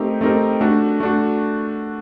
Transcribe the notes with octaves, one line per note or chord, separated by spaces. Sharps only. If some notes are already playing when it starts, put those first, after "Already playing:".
Already playing: A3 C4 D#4 G4 A#4
A3 C4 D#4 G4 A#4
A3 D4 F#4
A3 D4 F#4